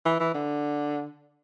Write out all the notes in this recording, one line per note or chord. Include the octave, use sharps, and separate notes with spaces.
E3
E3
D3